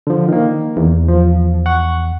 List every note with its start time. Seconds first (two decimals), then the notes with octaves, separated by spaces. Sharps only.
0.07 D3 F3
0.29 D#3 A#3
0.77 E2
1.08 F3
1.66 F#5 C#6